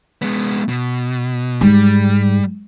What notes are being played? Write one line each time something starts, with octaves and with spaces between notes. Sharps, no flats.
G#3 B3
B2
G#2 G3